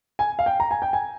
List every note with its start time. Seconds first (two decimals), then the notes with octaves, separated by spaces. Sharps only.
0.19 G#5
0.39 F5
0.46 G5
0.60 A#5
0.71 G#5
0.82 G5
0.93 G#5